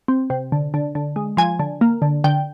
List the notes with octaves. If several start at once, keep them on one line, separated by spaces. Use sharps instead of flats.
C4
C3
D3
D3
D3
G#3
F3 G#5
D3
A#3
D3
D3 G5